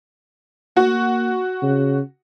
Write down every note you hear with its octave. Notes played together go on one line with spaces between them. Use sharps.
A#3 F#4
C#3